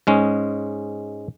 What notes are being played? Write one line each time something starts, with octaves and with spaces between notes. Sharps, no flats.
G#2 G#3 C#4